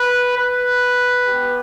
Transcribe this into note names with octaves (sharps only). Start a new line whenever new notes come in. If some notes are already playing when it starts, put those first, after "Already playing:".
Already playing: B4
B4
B3 G4